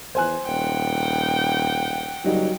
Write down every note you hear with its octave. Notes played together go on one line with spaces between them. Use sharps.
E2 C5 G#5 F#6
D#1 F#5 G5
F#1 F#3 G3 D#4